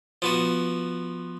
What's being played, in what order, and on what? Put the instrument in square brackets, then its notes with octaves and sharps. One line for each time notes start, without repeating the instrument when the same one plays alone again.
[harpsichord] F3 B3 F#4